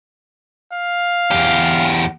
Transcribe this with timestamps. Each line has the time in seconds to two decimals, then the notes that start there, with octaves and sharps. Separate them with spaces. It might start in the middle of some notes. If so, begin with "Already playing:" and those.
0.73 F5
1.31 E2 G4